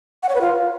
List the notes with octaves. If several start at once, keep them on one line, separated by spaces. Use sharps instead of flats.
F#5
C#5
B4
F4